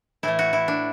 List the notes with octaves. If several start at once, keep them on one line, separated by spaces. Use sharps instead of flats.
A2 E3 A3 E4
F#4
E4
D4